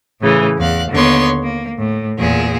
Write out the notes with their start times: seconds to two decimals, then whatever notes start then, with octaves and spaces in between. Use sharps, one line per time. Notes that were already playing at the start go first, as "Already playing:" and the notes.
0.20 A2 C#3 E3
0.58 E2 F5 F#6
0.91 D#2 D3 B3 C#5 C6
1.42 A#3
1.78 A2
2.17 E2 A#2 G#4